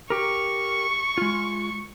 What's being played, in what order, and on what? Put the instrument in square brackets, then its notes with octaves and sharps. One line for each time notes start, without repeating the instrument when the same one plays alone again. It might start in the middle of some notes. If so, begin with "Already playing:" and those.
[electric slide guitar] G4 A#4 [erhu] C#6
[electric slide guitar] G#3 F4